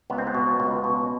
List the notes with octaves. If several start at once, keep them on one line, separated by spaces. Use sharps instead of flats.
C#2 B3
C4
B3
B2
C#2
B2